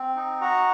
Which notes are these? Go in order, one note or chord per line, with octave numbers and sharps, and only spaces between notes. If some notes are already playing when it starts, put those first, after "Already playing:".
Already playing: C4
D#4
F#4 F#5 A#5